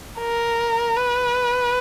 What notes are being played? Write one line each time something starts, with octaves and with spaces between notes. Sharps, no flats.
A#4
B4